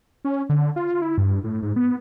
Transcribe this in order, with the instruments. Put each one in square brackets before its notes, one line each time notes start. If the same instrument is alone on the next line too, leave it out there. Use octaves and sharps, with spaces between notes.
[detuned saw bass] C#4
D3
F4
E4
G2
A2
G#2
B3